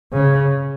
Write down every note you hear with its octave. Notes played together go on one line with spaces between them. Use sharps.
C#3